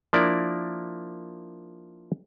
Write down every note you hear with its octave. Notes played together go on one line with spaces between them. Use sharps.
F3 A#3 D4 E4 A#4 D5